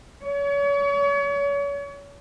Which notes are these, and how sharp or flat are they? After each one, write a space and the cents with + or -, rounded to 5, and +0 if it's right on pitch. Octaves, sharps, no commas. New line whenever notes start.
C#5 +35